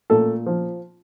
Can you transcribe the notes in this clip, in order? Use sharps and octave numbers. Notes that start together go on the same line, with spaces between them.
A#2 A3 A4
F3